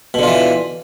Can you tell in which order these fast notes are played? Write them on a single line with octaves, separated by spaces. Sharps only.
B2 D3 F4 E3